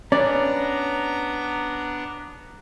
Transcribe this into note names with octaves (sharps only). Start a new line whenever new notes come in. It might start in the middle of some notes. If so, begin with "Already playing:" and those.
B3 C#4 D4 D5 A#5